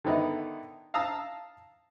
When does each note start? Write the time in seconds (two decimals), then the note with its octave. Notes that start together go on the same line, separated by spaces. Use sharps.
0.04 D3 D#3 B3 D#4 E4
0.94 F5 A5 A#5 D#6 E6